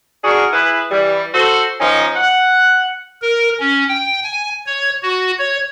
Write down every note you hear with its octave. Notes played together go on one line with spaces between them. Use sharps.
D4 F#4 G#4 A#4
E4 G#4 B4
E3 G3
F#4 A4 C5
D#3 F3 C#4 D#4
F#5
A#4
C#4
G5
G#5
C#5
F#4
C#5